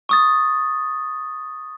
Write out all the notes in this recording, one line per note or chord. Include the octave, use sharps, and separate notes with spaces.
C#6 D#6 A6